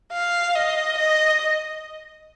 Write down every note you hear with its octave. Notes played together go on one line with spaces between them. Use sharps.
F5
D#5
D#5